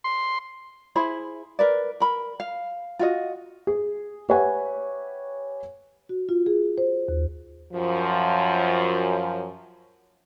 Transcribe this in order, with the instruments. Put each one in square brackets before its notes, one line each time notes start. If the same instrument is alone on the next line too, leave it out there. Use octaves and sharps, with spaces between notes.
[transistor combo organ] C6
[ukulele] E4 G#4 C5 B5
A#4 B4 D5
A#4 B5
F5
F4 F#4 D#5
[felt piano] G#4
G4 B4 C#5 E5 F#5 G#5
[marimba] F#4
F4
G#4
C5
D#2
[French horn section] F#2 F3